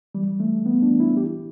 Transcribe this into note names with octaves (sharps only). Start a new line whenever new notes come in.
E3 G3
E3 A3
E3 B3
D4
E3
E4
E3 G4